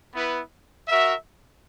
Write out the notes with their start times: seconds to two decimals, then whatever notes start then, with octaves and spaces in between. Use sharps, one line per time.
0.14 B3 E4 B4
0.88 F#4 A#4 E5